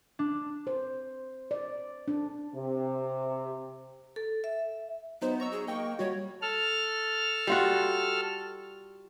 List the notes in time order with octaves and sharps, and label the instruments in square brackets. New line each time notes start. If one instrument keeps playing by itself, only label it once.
[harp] D4
[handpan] C5
D5
D4
[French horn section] C3
[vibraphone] A4
E5
[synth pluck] F#3 D#4 C5 [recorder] B3
[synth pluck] A#5 C#6 E6
[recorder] G#4
[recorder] A#3 [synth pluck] D#5 G5 C#6
[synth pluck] G3 F#4 [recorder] C#5
[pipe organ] A4 F6
[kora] G3 F4 F#4